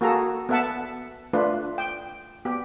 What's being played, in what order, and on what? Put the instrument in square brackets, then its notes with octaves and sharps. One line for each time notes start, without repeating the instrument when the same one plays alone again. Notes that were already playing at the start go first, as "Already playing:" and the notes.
[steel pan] A#3 F#4 G#4 A4 A#5
B3 A4 E5 F#5 A5
A3 D4 F4 B4
G5
B3 G4